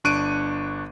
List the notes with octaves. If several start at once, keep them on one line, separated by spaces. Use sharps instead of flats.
G1 D4 C#6 F#6 D7 D#7